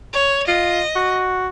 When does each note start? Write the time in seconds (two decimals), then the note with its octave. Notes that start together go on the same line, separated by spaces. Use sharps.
0.13 C#5
0.48 F4 D#5
0.96 F#4